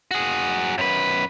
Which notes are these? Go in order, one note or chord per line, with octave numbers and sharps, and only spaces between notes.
F#4 G#4
F#2 B4